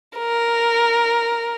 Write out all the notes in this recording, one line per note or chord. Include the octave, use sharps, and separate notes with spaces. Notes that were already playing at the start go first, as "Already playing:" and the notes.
A#4